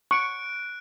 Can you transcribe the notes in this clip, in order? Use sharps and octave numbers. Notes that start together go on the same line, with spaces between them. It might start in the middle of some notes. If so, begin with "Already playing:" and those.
C#6 F#6 D7